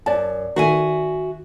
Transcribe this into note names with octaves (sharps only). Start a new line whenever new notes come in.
F#2 D5 A5
D#3 D#4 F#4 A4 E5 G#5